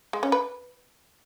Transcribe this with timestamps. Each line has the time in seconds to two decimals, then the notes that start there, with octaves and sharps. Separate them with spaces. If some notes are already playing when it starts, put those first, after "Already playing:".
0.13 G#3
0.23 C#4
0.32 B4